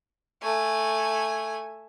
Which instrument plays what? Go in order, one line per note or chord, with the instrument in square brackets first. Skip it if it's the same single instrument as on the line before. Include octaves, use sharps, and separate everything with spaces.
[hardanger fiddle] A3 G#5